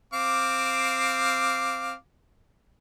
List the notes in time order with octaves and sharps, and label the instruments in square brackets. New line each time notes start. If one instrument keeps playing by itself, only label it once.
[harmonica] C4 F5 D6